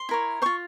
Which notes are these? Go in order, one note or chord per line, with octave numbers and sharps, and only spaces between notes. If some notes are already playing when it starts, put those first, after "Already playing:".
Already playing: C6
E4 A#4 C#5
F4 C5 C#6